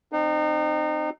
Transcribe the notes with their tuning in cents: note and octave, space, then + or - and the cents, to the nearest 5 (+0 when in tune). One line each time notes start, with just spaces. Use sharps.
C4 +0 D#4 -30